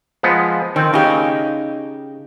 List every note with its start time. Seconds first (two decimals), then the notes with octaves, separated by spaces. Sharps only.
0.23 F3 G#3 B3
0.76 D#3 C4
0.94 C#3 D#4 G4